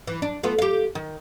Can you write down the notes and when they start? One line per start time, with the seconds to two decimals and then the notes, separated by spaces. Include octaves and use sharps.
0.07 E3
0.22 D4
0.43 A3 B3 F4
0.59 G4 F5
0.95 D#3